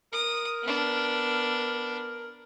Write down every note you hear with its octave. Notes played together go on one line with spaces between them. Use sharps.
A#4 D#6
B3 D4